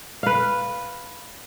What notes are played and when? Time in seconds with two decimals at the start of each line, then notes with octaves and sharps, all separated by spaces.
0.23 B4 F5